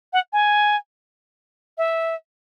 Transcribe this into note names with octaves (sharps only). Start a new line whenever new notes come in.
F#5
G#5
E5